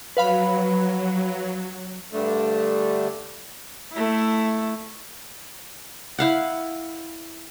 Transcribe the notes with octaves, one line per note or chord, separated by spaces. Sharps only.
F#3 B4 F5 B5
G2 D3 A3
A3 E4
E4 F5 F#5